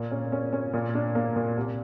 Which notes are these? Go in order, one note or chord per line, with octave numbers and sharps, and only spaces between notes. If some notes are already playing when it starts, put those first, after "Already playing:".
Already playing: A#2
C#4
C#4
C#4
A#2
D4
A#3
A#2
C2